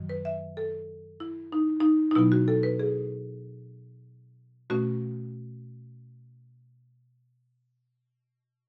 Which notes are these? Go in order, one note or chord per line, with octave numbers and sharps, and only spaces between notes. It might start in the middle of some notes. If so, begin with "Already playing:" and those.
Already playing: F#2 D#3 F#3
B4
E5
A4
E4
D#4
D#4
D#4
B2 F#3 B3 E4
F#4
A4
B4
G#4
B2 A3 C#4 F#4